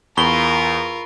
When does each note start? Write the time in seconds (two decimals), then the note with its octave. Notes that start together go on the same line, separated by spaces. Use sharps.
0.17 E2 F4 A#4 B5 C#6 G7